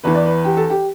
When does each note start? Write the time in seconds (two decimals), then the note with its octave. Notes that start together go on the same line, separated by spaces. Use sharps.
0.04 E2 E3 B4
0.15 D5
0.25 B4
0.45 G4
0.57 A4
0.70 G4